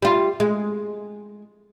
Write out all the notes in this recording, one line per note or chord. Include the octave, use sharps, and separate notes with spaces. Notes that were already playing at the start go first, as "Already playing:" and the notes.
G3 F4
G#3